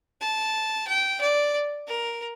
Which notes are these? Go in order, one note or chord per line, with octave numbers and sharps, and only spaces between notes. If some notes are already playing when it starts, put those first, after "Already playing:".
A5
G5
D5
A#4